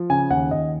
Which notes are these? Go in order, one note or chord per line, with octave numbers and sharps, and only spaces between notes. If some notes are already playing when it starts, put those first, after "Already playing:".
Already playing: F3
C#3 G#5
D#2 F#5
D#2 D#5